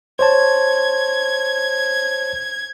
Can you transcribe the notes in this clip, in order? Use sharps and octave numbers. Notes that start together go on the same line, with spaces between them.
C5 C#5 A5 G#6